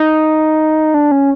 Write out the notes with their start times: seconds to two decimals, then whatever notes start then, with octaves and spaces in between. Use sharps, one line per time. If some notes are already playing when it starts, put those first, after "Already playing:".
Already playing: D#4
0.94 D4
1.12 C#4